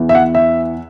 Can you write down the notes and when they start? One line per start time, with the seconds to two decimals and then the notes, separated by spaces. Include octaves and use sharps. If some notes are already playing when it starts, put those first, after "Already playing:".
Already playing: E2 E3
0.09 E5
0.15 F#5
0.35 E5